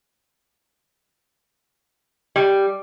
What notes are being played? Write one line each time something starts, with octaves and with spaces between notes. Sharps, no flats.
G3